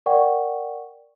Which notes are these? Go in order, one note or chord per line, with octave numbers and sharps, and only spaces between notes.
A#4 D5 F#5 G5 C#6